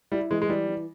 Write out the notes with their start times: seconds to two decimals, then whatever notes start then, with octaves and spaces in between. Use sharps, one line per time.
0.12 G3 E4
0.31 E3 G#3
0.42 G#3
0.49 E3 G3
0.68 E3